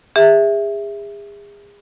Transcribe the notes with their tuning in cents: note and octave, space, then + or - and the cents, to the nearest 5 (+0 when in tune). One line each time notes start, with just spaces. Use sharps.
G#4 -35 E5 +0